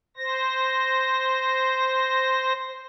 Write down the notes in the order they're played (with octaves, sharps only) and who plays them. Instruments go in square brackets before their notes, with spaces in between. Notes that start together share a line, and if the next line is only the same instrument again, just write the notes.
[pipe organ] C5 A#6